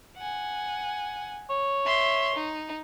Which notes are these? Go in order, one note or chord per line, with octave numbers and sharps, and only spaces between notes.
F#5 G#5
C#5
E5 C6
D#4